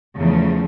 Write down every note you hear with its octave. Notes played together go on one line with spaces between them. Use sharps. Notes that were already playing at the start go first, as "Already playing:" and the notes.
E2 C#3 F3 A3